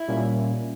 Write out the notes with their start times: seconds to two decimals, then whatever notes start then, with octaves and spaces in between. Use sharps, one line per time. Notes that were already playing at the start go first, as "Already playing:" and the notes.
Already playing: E4
0.08 A#2 G3 A#3 C#4